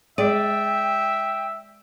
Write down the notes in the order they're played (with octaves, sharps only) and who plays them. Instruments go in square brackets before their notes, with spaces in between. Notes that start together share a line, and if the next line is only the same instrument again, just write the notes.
[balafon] G#3 G#4 [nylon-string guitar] D5 [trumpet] E5 [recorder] G5